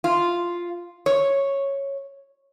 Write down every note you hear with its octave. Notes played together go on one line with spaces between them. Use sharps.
F4
C#5